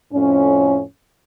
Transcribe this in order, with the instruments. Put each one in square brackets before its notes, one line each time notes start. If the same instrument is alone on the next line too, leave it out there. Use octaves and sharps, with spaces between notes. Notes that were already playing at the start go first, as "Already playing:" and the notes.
[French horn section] F2 A2 C#4